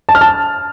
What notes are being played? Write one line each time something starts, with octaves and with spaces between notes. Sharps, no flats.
A5
F6
A5